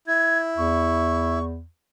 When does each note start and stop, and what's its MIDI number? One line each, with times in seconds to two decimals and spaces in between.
0.07 1.39 64
0.07 0.38 92
0.57 1.64 40
0.57 1.44 85